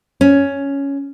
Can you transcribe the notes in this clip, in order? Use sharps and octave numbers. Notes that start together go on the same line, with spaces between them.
C#4